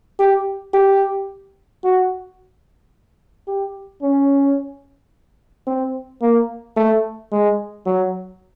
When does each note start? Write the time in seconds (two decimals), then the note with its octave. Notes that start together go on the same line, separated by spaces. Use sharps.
0.20 G4
0.74 G4
1.84 F#4
3.48 G4
4.02 C#4
5.67 C4
6.22 A#3
6.77 A3
7.32 G#3
7.86 F#3